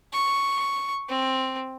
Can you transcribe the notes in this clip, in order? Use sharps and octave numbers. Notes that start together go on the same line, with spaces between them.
C#6
C4